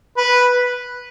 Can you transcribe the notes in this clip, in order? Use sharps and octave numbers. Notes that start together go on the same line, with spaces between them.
B4